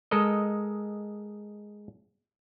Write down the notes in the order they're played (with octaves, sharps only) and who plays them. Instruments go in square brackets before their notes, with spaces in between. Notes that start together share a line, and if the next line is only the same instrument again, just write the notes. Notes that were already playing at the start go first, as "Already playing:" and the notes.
[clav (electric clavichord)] G#3 A4 A#4 D#5